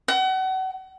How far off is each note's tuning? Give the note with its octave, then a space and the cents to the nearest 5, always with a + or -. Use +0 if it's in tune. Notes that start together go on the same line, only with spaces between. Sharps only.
F#5 +35